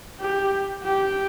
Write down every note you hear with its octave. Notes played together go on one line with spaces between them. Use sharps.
G4
G4